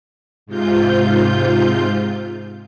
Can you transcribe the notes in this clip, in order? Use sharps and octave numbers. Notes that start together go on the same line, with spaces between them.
G#2 C3 F4 G6